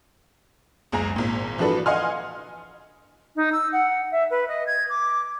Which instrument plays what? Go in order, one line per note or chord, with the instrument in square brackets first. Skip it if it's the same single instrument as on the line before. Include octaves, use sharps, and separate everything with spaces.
[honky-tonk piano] F#1 C#2 G#5 A#5
G#1 A#2
E3 F3 D4 F#4 A4 B4
D#5 F5 F#5 G#5 C6 F6
[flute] D#4
E6
F#5
E5
B4
D#5
G#6
D6